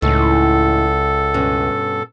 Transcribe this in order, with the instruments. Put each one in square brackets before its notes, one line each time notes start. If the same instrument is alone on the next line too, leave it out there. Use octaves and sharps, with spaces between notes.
[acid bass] C#2 [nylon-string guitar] A2 D#4 [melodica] A4
[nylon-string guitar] G2 B2 C#4